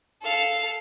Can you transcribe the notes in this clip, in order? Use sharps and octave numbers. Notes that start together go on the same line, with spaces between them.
A4 F5